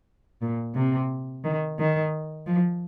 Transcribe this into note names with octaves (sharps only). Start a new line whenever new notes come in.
A#2
C3
D#3
D#3
F3